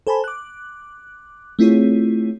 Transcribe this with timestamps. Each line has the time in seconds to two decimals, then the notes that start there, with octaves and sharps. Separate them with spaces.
0.07 A4 C5 G#5 A5 B5
0.24 D6 F#6
1.59 A3 C4 E4 F4 G#4 C#5